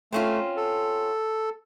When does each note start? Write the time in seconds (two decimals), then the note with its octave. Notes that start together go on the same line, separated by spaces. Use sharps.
0.13 A3 C4 C#4 F4
0.57 A4